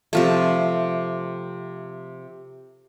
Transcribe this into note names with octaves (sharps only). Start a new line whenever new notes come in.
C3 F3 A3